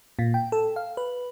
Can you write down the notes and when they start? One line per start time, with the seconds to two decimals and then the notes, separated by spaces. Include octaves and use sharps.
0.19 A#2
0.34 G5
0.52 A4
0.76 F5
0.97 B4